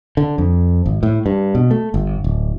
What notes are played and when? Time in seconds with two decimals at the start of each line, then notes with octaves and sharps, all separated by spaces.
0.17 D3
0.38 F2
0.86 G#1
1.03 A2
1.26 G2
1.55 B2
1.71 A3
1.94 G1
2.24 D1